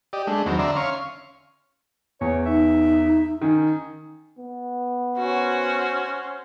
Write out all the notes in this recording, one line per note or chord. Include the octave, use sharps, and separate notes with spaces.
G4 D5 D#5
G#3 A3 D4
E2 D#3 F#3 C4
D3 D5 E5 A#5 C6
C#4 F5 C6 C#6
E2 C#5
D#4 E5
D#3 C#4
B3
C#4 F#4 C5